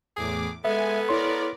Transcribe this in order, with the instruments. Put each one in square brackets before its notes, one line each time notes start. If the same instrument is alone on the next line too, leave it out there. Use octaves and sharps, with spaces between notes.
[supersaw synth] E2 A2 D6 [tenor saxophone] G#4
[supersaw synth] G#3 G#5 [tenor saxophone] B3 [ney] A4 [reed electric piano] E5
[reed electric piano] E4 C#5 C6 [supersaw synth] A#4 D5